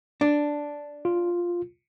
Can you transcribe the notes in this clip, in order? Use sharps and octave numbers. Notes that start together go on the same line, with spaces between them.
D4
F4